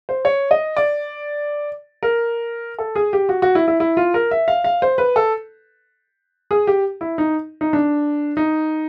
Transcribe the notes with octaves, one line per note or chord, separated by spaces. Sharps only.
C5
C#5
D#5
D5
A#4
A4
G#4
G4
F#4
F#4
E4
E4
E4
F4
A#4
E5
F5
F5
C5
B4
A4
G#4
G4
E4
D#4
D#4
D4
D#4